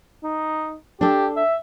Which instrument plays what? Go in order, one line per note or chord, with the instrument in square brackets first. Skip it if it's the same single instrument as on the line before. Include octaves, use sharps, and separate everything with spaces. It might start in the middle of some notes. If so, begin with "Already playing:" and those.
[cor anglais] D#4
[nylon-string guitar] D4 A4 [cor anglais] G4
[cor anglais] E5